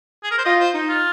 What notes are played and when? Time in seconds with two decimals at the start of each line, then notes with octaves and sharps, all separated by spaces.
0.23 G#4
0.31 A#4
0.38 C5
0.45 F4 D#5
0.60 C5
0.74 D#4
0.89 F4